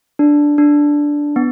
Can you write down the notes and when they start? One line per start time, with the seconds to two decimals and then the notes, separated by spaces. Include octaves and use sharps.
0.19 D4
0.58 D4
1.36 B3